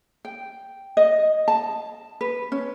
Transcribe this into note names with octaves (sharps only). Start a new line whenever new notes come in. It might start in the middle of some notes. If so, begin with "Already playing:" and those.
G5
D#5
A5
B4
C#4